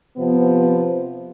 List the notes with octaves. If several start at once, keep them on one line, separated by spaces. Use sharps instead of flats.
C3 F3 B3